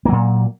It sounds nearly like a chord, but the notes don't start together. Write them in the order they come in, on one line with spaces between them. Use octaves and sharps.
A#3 F#3 A#2